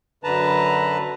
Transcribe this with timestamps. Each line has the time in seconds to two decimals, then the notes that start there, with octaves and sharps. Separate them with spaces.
0.24 F#2 D3 B4 A5 A#5